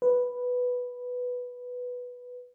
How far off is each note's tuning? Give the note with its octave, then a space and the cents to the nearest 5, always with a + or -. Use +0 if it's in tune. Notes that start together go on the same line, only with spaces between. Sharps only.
B4 +0